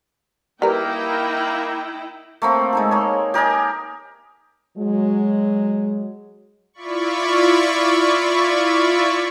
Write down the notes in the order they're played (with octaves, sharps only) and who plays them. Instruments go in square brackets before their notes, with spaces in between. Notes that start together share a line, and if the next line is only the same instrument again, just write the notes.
[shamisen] G3 A#4 B4 [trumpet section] A#3 [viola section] D#4 E4 G5
[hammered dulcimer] A3 A#3 C4
G#3 D#4 A4
A#3 C#5
G4 A#4 D#5 G#5
[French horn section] F#3 G#3
[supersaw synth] E4 F4 D5 B5 C#6